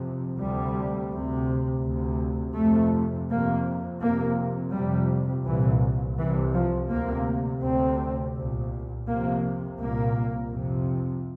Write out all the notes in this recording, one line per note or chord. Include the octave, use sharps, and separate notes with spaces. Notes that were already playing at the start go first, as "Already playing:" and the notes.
Already playing: F2 C3
D2 C3 G3
D2 C3
D2 C3
F2 C3 A3
F2 C3 A#3
F2 C3 A#3
F2 C3 G3
C2 A#2 E3
C2 C3 E3
F3
D2 C3 A#3
D2 C3 C4
C2 A#2
F2 C3 A#3
C2 A#2 A#3
F2 C3